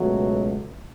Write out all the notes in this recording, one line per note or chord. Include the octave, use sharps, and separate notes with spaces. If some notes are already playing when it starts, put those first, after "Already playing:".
Already playing: C#2 B2 F#3 A3